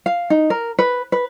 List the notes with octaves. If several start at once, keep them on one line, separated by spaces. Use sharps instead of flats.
F5
D#4
A#4
B4
B4